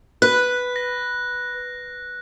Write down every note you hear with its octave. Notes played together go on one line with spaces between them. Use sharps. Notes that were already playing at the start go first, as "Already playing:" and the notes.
B4 F#6
A#6